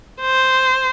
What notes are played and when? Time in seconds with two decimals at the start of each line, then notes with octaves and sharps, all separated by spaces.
0.21 C5